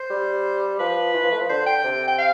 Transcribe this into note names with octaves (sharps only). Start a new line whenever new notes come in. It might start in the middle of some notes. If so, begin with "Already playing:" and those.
Already playing: C5
G3
F3 B4
E3
F3
A3
F3
D3 C5
G5
C3
G5
F5